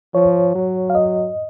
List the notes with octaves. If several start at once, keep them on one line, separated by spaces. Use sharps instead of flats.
F3 C#5
F#3
F5
D#5